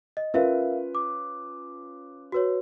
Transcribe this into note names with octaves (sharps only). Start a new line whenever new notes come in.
D#5
C#4 F4 A#4 B4 E5 F5
D6
F#4 B4 C#5